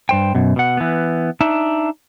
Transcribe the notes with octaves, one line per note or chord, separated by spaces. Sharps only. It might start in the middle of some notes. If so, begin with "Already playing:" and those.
G2 C5 G5
F#2 B2
B2 F#5
E3 B3
D4 D#4 E5